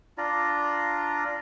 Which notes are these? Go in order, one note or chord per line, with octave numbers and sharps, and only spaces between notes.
D4 F4 D5 A#5